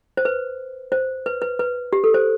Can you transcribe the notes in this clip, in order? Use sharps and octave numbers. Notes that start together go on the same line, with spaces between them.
C5
B4
C5
B4
B4
B4
G4
A4
C5